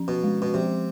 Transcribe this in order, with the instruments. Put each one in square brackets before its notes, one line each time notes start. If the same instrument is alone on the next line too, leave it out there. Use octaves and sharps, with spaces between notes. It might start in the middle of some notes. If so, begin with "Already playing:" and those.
Already playing: [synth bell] F3 C#4
[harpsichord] B2
[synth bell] G#3
[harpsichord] B2
[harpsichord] C3 [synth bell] F3